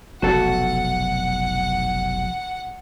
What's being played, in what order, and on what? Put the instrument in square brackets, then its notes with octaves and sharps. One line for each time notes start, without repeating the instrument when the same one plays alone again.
[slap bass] F1 B1 [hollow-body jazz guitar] F#4 A4 [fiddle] F#5